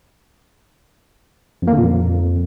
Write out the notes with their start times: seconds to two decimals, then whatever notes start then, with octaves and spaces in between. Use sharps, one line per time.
1.62 F2
1.67 A#3
1.73 D3
1.78 A#2
1.83 F2